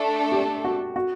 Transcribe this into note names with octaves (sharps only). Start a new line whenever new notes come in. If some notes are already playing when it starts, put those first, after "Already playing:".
Already playing: A3 D4 A4
G4
F#4
F#4